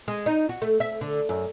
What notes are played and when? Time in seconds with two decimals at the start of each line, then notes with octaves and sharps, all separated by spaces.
0.08 G#3
0.26 D#4
0.49 F#4
0.62 A3
0.80 E5
1.01 D3
1.29 F#2